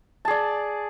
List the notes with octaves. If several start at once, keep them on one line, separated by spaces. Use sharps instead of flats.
G#4 D5 A5